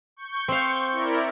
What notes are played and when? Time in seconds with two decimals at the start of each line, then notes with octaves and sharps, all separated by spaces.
0.16 C#6 G6
0.48 C4 F5
0.92 E4 A#4 D5